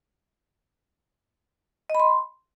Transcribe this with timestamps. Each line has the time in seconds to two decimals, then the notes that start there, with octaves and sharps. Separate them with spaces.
1.90 D#5
1.95 B5
2.00 C6